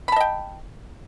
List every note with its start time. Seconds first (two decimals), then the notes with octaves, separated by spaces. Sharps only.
0.08 B5
0.12 A5
0.16 D#5
0.20 G5